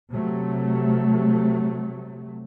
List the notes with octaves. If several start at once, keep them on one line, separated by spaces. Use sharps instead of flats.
C3 F#3 A3